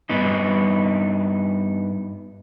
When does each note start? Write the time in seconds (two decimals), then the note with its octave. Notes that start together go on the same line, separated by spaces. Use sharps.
0.09 G2 B3 D#4